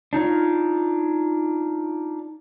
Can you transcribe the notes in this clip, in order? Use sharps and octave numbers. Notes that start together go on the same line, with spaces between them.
D4 D#4 F4 C#5